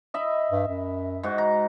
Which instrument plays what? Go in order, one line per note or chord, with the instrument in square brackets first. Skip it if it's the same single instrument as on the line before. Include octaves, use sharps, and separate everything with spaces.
[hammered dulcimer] D#5 E5 B5
[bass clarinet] G2
F#2
[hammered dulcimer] G#2 F#4
A#5